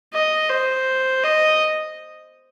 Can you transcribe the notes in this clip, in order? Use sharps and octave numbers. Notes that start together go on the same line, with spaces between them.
D#5
C5
D#5